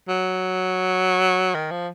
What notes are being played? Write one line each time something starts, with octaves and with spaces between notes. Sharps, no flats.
F#3
D#3
F3